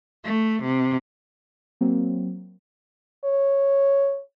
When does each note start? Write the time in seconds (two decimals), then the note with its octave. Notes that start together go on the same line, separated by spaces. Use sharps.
0.23 A3
0.63 C3
1.81 F#3 A#3 C4
3.25 C#5